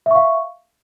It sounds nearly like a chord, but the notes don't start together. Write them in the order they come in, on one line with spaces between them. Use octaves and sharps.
E5 C#6 F5